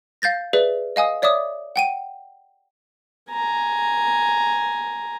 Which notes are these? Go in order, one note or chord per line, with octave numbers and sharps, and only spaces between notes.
F5 G6 A6 A#6
G#4 B4 D5 E5
D#5 F5 G#5 D#6
C#5 D5 E5 D6 D#6
F#5 G5 D#7
G#5 A#5